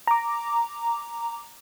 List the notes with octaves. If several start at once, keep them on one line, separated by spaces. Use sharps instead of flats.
A#5 D6